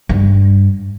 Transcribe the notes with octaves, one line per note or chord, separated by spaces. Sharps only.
G2